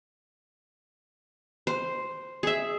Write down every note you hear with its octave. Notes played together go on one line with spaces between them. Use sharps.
C5
G#4 E5